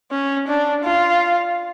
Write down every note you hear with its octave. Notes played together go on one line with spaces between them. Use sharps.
C#4
D4
F4